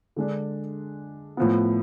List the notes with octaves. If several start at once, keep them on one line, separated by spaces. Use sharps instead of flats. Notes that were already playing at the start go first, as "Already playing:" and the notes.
D3 G#3 D4
A2 F3 B3